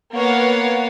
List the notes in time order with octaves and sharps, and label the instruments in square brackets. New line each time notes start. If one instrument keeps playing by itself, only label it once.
[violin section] A#3 B3 C#5 F5 F#5